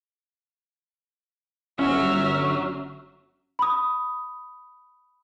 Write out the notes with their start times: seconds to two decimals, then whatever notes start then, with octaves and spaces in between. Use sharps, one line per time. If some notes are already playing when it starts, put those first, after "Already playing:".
1.79 G1 F#3 C#4 E5 F6
3.59 B5 D#6